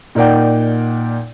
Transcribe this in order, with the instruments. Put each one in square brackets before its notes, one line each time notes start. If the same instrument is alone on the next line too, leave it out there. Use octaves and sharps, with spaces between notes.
[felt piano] A#2 D#4 A#4 D5 F#5 G5